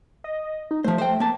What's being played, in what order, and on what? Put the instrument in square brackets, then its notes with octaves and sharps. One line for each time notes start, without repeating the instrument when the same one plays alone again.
[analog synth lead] D#5
D#4
[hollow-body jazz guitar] F3 C5 [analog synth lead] A3
[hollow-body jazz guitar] C5 G5
A#3 A5